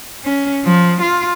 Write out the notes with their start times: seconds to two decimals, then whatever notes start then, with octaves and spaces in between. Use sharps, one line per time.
0.25 C#4
0.65 F3
1.01 F4